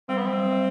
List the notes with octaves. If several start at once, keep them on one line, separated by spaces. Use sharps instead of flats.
G3 C4
B3
F#3 C4
G3
F#3
G3